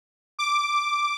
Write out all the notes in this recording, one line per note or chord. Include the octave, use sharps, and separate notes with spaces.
D6